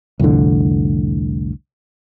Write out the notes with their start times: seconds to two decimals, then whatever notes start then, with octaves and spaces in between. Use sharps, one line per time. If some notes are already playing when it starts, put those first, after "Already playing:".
0.19 C2 F2 A2 D3